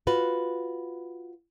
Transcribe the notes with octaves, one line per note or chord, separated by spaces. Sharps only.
F4 F#4 B4